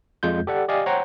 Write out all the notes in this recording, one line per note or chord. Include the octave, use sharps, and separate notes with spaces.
F2 G#3 F4 G6
G4 A4 D5 F#5
G4 D5 D#5 F5 G#5
C5 C#5 F#5 G5 A#5 C6